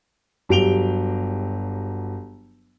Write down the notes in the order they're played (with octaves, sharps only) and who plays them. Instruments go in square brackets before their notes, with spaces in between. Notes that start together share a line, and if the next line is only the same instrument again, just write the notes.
[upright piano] G1 F#3 G4 D7 F7 G7